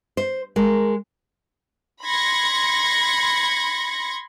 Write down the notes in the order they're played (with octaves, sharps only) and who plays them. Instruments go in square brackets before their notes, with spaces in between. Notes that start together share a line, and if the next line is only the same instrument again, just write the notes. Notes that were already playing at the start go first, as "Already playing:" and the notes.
[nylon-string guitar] C5
[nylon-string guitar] G#3 [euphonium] A#4
[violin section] B5 C6 G#6 A#6 C#7